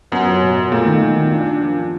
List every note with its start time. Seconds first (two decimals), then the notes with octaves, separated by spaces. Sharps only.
0.12 F#2 B3
0.27 F#3
0.42 B2
0.57 B2
0.72 A#2 A3
0.86 D#3
1.01 D#3
1.16 D#3
1.31 D4
1.47 D4
1.61 F3
1.76 D4